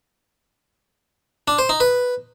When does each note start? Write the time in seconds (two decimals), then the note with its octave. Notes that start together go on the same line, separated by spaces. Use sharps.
1.48 D4
1.58 C5
1.69 D#4
1.80 B4